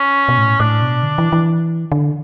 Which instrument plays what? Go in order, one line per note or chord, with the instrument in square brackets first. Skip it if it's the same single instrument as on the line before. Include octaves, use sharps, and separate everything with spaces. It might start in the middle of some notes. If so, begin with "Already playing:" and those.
Already playing: [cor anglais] C#4
[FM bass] B2
A2
[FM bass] A2 [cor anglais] D4
[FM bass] B2
D3
E3
E3
D3